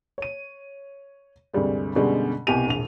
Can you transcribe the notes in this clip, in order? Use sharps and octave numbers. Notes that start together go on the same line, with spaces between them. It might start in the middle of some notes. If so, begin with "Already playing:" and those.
C#5 D#7
D2 G2 C3 G3 G#3
F#2 B2 D3 G3 G#3
C2 B2 G4 G#5 D#7 F7
E1 A#1 F7